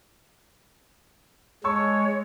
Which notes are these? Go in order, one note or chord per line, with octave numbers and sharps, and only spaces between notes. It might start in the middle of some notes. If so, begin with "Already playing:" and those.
G#3 C#5 A5 C#6 E6